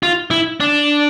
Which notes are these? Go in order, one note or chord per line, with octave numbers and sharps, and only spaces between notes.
F4
E4
D4